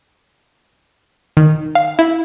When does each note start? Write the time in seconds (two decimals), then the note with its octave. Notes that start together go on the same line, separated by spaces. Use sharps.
1.37 D#3
1.75 F5
1.99 E4